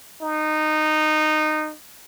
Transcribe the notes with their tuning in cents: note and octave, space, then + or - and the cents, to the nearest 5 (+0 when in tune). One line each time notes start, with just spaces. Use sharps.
D#4 -15